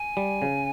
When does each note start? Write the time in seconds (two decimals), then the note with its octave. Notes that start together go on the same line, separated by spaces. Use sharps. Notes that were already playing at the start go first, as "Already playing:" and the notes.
Already playing: G#5
0.17 G3
0.42 C#3